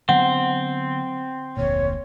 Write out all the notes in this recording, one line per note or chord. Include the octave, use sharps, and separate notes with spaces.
D3 F#3 B3 C4 F#5
F1 D2 A#2 C#5